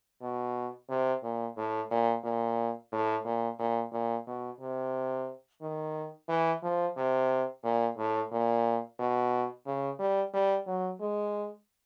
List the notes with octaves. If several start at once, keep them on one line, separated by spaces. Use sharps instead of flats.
B2
C3
A#2
A2
A#2
A#2
A2
A#2
A#2
A#2
B2
C3
D#3
E3
F3
C3
A#2
A2
A#2
B2
C#3
G3
G3
F#3
G#3